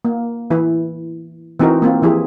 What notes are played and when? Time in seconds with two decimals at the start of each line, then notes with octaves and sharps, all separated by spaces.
0.05 A#3
0.50 E3 E4 B4
1.59 E3 C4 D#4 F#4 A#4
1.82 A#3 C4 F4
2.02 E3 F3 E4 G4 G#4